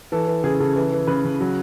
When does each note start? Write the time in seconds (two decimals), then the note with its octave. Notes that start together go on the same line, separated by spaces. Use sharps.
0.12 E3 A4
0.27 E3
0.44 C#3 G#4
0.60 C#3 A4
0.76 E3
0.93 E3
1.07 C#3 B4
1.25 C#3
1.40 F#3